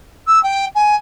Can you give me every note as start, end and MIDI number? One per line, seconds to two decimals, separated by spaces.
0.27 0.41 88
0.43 0.65 79
0.75 0.95 80